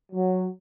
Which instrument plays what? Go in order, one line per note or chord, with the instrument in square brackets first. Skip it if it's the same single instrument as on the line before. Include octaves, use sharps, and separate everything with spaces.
[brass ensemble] F#3